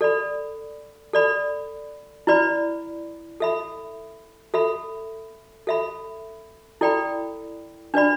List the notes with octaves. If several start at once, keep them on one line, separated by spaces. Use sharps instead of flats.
A4 D5 B5
A4 D5 B5
E4 B4 D5 B5
A4 E5 B5
A4 E5 B5
A4 E5 B5
E4 A4 D5 G5 B5
D4 B4 D5 B5